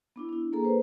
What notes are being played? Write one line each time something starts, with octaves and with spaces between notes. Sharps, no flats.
B3 D4 E4
D4 E4
A#3 G#4 A4 A#5
B4 C5